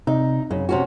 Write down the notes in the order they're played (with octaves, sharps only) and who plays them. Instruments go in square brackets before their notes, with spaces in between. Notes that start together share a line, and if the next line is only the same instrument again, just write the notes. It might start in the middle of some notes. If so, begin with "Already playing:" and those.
[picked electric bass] C3 [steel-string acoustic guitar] D#4
[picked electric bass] F#2 [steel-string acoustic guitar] C#3
[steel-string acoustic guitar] C3 C#4 F#4